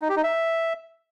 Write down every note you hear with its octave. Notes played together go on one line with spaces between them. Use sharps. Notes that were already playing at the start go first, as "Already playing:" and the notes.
D#4
G4
D#4
E5